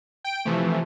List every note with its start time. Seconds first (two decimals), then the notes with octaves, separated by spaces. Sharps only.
0.24 G5 D7
0.45 C3 E3 F3 A3